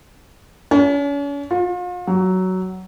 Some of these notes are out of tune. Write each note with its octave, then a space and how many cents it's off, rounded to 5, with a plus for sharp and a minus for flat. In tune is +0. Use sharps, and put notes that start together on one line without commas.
C#4 +40
F4 +40
F#3 +10